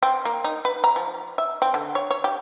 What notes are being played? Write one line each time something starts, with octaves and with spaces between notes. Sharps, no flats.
C4
A#3
D#4
B4
A#5
F3
E5
C4
D3
C#5
C#5
G4